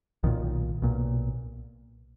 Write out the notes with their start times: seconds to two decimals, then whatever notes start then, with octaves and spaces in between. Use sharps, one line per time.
0.23 B1 A#2 D#3
0.82 B1 A#2